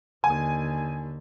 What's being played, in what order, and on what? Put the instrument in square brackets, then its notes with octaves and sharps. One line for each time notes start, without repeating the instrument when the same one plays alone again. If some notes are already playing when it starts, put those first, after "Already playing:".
[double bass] D#2 D3 [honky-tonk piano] G#5